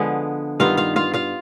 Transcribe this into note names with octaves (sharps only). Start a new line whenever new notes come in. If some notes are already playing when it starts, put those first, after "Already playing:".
Already playing: D3 F3 G#3 B3
G2 D#3 B3 F4 F5
F4 F5
F4 F5
F4 F5